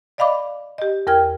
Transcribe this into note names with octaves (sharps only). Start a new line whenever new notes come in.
D5 D#5 F5 B5 D6
G4 D#5
E2 A#4 G5 F6 G#6